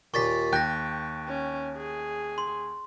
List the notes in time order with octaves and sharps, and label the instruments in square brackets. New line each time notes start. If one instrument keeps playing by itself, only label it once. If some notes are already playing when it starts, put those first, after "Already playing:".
[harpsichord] D#2 A#2 [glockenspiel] C#6 A6 B6
[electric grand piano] D#2 G5 G6 [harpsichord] C#6 [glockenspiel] F#6 A#6
[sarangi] C#4
G#4
[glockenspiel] C6